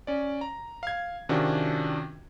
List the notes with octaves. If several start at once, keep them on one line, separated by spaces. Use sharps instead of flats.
C#4 D5
A#5
F5 G#6
C3 D#3 C#4 D4 F4 F#4